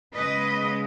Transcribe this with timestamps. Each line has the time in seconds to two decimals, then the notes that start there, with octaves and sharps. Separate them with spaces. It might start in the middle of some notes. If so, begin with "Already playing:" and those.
0.14 C#3 G#3 B3 B4 D#5